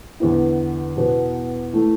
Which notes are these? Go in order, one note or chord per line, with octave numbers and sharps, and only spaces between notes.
E2 D3 B3 E4
E2 B2 B3 F#4 B4
E3 A3 E4